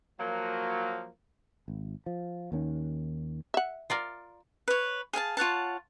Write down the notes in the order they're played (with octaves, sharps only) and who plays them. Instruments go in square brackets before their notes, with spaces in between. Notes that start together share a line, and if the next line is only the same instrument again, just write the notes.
[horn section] F3 F#3 A#3
[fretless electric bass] G#1
F3
D#2 D#3 C#4
[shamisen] E5 F#5
[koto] F4 A#4 D5
[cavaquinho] B4 C#5
G#4 F5 G#5 A5
F4 C#5 F#5 A5